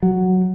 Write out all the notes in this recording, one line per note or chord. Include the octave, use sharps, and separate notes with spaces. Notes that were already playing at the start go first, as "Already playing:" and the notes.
F#3